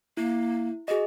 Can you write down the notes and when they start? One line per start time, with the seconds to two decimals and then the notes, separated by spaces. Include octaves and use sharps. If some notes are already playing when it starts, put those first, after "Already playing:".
0.17 A#3 E4
0.88 F#4 G#4 D#5